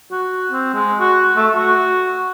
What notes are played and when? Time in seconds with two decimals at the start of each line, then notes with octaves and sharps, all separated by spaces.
0.11 F#4
0.51 C4
0.74 G#3
1.00 F#4
1.36 A3
1.56 F#4